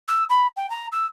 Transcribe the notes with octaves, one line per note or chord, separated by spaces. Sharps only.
E6
B5
G5
A#5
E6